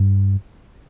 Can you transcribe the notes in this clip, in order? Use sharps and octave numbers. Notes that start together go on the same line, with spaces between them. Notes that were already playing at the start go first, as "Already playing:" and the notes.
Already playing: G2